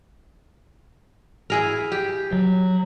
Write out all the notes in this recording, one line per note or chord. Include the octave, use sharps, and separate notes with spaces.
E4 G#4 A#4
G4
F#3